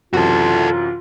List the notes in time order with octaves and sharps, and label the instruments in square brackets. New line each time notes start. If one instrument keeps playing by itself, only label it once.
[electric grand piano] F#2 C3 E3 [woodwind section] F4 [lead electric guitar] F#4 A4